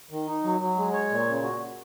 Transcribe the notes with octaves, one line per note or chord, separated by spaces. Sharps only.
D#3
D#4
F#3
F#3
G#3
C#5
A#2
C#3
F#4